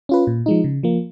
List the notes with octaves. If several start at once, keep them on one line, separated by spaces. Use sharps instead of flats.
C#4 F4 B4
A#2
F3 G#3 D#4
C#3
F3 A#3